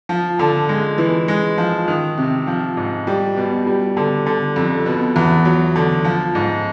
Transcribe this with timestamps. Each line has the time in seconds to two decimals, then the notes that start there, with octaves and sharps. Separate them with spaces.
0.09 F3
0.39 D3
0.69 G#3
0.98 E3
1.28 G#3
1.58 F3
1.88 D#3
2.17 C3
2.47 F3
2.77 G#2
3.07 G3
3.37 B2
3.67 G3
3.97 D3
4.26 D3
4.56 F2
4.86 B2
5.16 E2
5.45 F#3
5.75 D3
6.05 F3
6.35 G#2